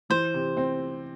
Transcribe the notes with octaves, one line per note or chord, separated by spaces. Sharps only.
E3 C5
C3
C4